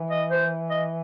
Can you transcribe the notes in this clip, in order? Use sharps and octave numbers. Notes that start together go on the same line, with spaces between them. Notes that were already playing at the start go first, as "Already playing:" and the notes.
Already playing: E3
D#5
C5
D#5